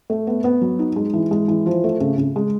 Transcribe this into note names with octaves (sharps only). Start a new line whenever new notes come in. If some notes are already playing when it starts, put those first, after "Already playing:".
A3
B3
B3
F#3
D#4
G#3
E3
G#3
E3
F3
A3
C#3
C#3
G#3